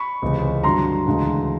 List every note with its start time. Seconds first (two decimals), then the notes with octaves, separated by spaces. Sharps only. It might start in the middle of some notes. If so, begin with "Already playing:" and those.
Already playing: B5 C#6
0.22 C#2 C3 E3 G#3
0.63 G2 D3 F#3 A#5 C6
1.07 D2 C#3 E3 G#3